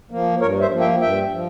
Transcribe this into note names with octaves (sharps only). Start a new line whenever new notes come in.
F3 A#3
G2 A#4 C#5
C5 E5
F3 A#3
E5 G5
G2 E5 G5
F3